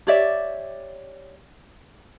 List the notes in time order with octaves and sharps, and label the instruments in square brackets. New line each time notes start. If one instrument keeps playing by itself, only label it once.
[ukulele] G4 C#5 D5 E5